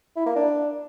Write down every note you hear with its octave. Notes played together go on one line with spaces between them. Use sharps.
E4
A#3
D4